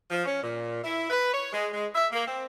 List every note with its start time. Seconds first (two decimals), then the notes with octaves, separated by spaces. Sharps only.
0.10 F3
0.25 C#4
0.42 A#2
0.83 E4
1.10 B4
1.32 C#5
1.52 G#3
1.72 G#3
1.94 E5
2.12 A#3
2.26 C4